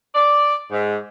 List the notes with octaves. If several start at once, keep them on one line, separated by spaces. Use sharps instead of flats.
D5
G#2